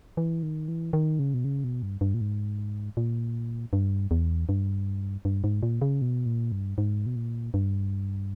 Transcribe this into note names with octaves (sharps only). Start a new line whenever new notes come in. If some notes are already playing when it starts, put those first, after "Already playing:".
E3
D#3
E3
D#3
C#3
B2
C#3
B2
G2
G2
A#2
G#2
A#2
G2
E2
G2
G2
G#2
A#2
C#3
B2
A#2
G2
G#2
B2
A#2
G2